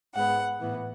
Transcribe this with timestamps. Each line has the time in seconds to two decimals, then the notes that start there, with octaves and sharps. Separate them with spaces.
0.15 G#2 G#3 B3 F#5
0.59 A2 E3 B3